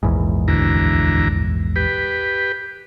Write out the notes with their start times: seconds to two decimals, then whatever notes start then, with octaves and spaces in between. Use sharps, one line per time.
0.03 A#1 E2 G#2
0.48 D2 E3 A#5
1.76 G4 B4